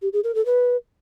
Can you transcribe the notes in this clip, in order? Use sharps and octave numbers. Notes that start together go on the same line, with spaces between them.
G4
G#4
A#4
A4
B4